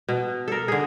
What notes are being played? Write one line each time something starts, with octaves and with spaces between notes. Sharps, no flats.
B2
A4 A#4
D3 G#4